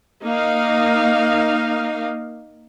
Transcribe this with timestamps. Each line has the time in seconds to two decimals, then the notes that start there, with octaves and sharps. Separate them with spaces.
0.23 A#3 D#4 F5